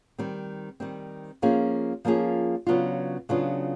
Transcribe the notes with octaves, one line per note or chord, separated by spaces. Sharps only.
D#3 G3 C4
D#3 G3 C4
F3 A#3 C#4 F4 G#4
F3 A#3 C#4 F4 G#4
C#3 F#3 B3 D4 F4
C#3 F#3 B3 D4 F4